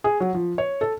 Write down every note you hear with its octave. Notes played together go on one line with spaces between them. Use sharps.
G#4
F#3
F3
C#5
A4